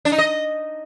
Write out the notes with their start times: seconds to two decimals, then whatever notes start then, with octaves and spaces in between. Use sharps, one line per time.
0.05 D4
0.12 D#4
0.18 D#5